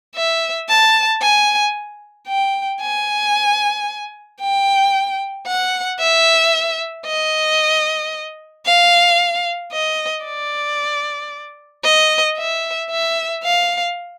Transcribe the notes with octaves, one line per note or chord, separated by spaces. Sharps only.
E5
A5
G#5
G5
G#5
G5
F#5
E5
D#5
F5
D#5
D5
D#5
E5
E5
F5